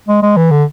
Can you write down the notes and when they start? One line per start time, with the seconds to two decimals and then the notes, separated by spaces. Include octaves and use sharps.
0.08 G#3
0.22 G#3
0.37 E3
0.51 D3